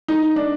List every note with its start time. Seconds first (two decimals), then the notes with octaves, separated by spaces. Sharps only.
0.08 D#4
0.36 D4